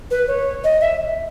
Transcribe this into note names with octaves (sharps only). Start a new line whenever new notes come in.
B4
C#5
D#5
E5